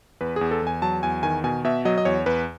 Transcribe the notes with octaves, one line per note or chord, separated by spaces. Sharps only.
E2 B4
E2 G#4
A4
E2 G#5
F#3 A5
E2 G#5
D#3 G#5
B2 G#5
B2 E5
F#3 D#5
D#5
E2 C#5
E2 B4